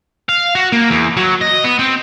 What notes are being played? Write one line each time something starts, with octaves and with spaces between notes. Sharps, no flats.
F5
F#4
A#3
E2
F#3
D#5
B3
C4